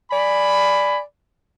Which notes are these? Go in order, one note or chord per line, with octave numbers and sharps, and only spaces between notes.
D5 G#5 B5